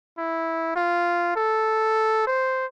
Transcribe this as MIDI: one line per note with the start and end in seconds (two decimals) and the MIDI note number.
0.18 0.75 64
0.76 1.33 65
1.36 2.26 69
2.27 2.66 72